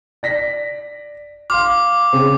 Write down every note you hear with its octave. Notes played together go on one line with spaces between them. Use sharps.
D5 A#6 B6
F5 C6 D6 F6
C#3 C4